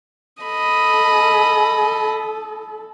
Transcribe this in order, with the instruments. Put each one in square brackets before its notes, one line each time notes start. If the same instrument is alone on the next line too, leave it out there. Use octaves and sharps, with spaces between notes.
[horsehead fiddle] A4 [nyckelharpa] D#5 B5